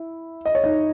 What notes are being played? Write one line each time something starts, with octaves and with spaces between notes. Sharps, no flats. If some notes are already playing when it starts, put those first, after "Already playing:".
Already playing: E4
D#5
C#5
D#4 D#5